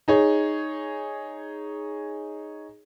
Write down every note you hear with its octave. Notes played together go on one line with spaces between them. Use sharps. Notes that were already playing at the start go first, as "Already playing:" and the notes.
D#4 G#4 C#5